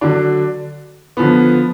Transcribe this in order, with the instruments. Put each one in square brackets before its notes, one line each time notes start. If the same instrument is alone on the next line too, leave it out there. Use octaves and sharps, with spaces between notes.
[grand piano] D3 F#3 D4
D3 F3 B3